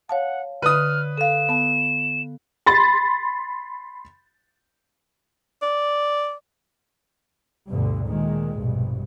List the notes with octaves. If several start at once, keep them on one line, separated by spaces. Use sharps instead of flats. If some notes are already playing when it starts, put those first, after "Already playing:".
C#5 F5 F#5 A5
D3 B4 D#6 F6
A4 F5 E7
B3 A5
B5 C6 A6
D5
D2 G2 B2 D3
A#2 D#3 G#3
A#1 G2 B2